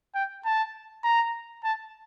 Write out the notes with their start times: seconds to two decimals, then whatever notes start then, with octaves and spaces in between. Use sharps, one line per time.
0.15 G5
0.45 A5
1.04 A#5
1.64 A5